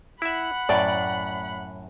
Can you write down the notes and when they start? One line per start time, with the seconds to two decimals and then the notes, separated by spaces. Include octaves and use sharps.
0.22 E4 E5 F#5 B5
0.69 F#2 A2 D5 G5